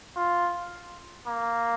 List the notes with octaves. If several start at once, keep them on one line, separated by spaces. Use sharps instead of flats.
F4
A#3